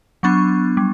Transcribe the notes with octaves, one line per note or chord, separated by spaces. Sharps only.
F#3 B3 D4 C#6
G3